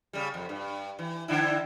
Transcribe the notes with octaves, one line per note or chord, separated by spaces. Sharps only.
C#3 G3
F2
G2
E3
D3 D4 E4